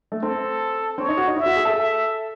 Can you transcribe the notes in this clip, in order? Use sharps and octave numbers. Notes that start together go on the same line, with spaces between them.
A3
C4 A4
C4 C#5
D#4
F#4
D#4
E4 E5
F#4
G#4
A4
E5